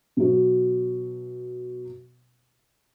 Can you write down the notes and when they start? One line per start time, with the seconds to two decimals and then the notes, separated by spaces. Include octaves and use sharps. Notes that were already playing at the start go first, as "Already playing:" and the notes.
0.17 B2 F#3